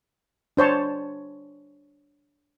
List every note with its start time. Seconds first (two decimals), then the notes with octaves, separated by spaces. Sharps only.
0.57 D4 C5 C#5 A5